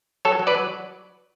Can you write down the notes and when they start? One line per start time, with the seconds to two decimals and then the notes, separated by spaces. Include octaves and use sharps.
0.25 F#3 A4 C#5
0.39 F#3
0.47 B4 D5
0.55 F#3